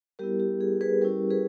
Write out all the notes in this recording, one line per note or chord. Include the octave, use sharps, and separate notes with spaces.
G3 B3 E4 G4 A#4
G4
G#4
G#4 B4
G3 C#4 E4 G4 A#4
G#4 B4